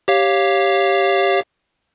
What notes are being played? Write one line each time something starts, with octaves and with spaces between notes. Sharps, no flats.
G4 C#5 F5